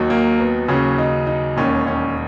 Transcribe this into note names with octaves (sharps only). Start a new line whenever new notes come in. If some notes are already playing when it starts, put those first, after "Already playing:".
Already playing: D#2 D#3 F#3
A#3
B3
D#2 C#3 F#3 C#4
D#4
D#4
E1 D#2 D#3 C#4
C#4